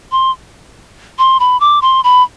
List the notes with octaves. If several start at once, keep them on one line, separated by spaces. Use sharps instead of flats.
C6
C6
B5
D6
C6
B5